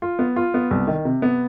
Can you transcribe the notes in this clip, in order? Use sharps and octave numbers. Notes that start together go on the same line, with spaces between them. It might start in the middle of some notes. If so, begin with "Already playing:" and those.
F4
B3
F4
B3
C2
D#3
C3
B3